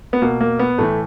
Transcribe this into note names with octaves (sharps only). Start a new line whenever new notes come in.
B3
B2 A#3
A#3
B3
A2 E3 A3